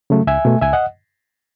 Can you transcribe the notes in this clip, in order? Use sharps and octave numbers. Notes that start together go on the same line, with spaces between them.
C#3 F#3 A3
C#2 E5 G#5
B2 A3
C#2 E5 G#5
D#5 F#5